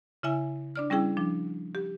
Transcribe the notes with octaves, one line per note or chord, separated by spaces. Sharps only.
C#3 E4 E5 G#5
D4 D5 F6
G3 C#4 E4 G#4 G5
F3 D4
G4